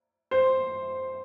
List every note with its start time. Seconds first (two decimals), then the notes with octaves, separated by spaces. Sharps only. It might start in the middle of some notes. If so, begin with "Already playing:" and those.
0.31 C5